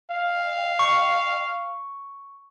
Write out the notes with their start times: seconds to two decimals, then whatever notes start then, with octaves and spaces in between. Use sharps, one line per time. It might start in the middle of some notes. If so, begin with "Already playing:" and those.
0.11 F5
0.79 C#6